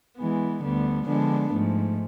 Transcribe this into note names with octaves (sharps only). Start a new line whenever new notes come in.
E3 G#3 B3
D2 D3 G3 B3
D3 F3 G#3 B3 D4
G#2 F3 A3